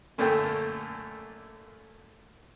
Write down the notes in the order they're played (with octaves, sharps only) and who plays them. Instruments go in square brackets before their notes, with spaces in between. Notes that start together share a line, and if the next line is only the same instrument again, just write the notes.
[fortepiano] F#2 A#2 D3 A3 G5